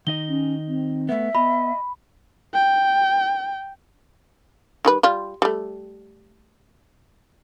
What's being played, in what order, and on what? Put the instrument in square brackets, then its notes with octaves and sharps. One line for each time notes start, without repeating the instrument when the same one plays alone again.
[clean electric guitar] D#3 D#4 D#5 [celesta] G7
[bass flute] C#4
C4
[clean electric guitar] A3 B3 [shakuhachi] E5
[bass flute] B3 [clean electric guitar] D#5 [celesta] B5
[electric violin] G5
[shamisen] D#3 G3 B4
G3 F4
G3 A3